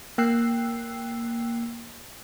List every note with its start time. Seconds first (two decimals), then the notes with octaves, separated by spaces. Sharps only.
0.18 A#3 G5 E6 F#6 C7